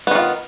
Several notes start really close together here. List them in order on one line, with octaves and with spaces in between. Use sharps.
B3 D#3 F4